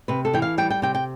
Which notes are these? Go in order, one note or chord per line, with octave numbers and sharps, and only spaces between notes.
C3 B4
A4
E3 G5
F5
G3 G5
G5
C3 G5
G5